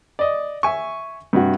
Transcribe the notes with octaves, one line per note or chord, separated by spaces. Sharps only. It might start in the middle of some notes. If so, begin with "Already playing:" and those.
D5 D#5
E5 G#5 C#6
G2 C3 F#4